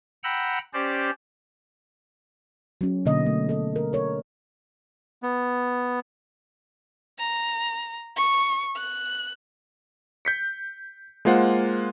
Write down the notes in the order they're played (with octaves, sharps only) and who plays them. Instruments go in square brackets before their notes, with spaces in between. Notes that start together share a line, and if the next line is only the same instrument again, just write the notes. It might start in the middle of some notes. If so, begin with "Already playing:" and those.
[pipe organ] F#5 G5 A#5 B5 E6
C#4 G4 C5 D5
[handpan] F#3 C#4
B2 D3 A#3 D#5
A3
A4 D#5
A#4
A#4 C#5
[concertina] B3
[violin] A#5
C#6
F#6
[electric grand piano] G6 B6 C#7
G#3 A#3 F4 C5 F#5